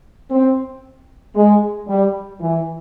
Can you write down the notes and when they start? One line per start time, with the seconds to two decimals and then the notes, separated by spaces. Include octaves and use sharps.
0.30 C4
1.36 G#3
1.88 G3
2.41 E3